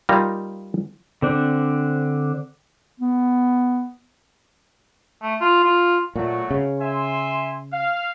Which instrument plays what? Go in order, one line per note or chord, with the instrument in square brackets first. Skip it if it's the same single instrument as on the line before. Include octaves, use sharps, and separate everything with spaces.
[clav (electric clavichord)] G3 A#3 D#4 F4 A#5
[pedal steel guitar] D3 C4 D4
[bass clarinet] B3
[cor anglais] A3
F4
F4
[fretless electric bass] A#2 [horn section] F#3 A3 F#4
[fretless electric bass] C#3
[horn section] E5 G#5 C6
F5